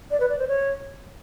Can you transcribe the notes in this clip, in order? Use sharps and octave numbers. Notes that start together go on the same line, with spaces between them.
D5
B4
D5
C5
C#5